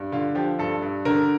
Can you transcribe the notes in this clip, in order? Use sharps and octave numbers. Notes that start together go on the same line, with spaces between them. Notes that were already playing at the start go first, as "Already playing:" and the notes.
Already playing: G2
D3 F4
F3 G4
G2 A4
G2
D3 A#4